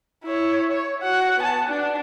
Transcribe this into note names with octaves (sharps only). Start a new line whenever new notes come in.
E4 C#5
C#5
F#4 F#5
B3 A5
D4